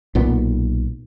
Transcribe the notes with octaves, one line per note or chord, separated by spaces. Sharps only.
B1 A#2 B3